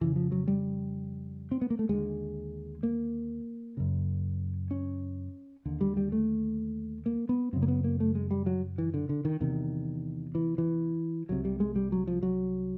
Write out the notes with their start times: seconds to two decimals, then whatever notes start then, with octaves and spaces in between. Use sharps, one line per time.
0.01 F2 C#3 E3
0.16 F3
0.32 F#3
0.48 G3
1.51 C4
1.61 B3
1.70 A#3
1.79 A3
1.89 D#2 D3 G#3
2.83 A#3
3.77 F#2 C#3
4.71 C#4
5.65 D#2 D3
5.81 G3
5.97 G3
6.12 A3
7.06 A#3
7.29 B3
7.53 F#2 C#3 C4
7.62 A#3
7.68 B3
7.84 A#3
8.00 A3
8.15 G#3
8.31 G3
8.46 F#3
8.78 E3
8.94 D3
9.09 D3
9.25 D#3
9.40 E2 C3 D#3
10.35 E3
10.58 E3
11.29 C2 C3 F#3
11.45 G3
11.60 G#3
11.76 G3
11.92 F#3
12.07 F3
12.23 F#3